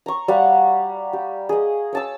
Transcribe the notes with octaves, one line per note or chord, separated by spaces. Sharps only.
A#5 C#6
G3 F5 F#5
G4
G#4 D#5
C#5 A5 E6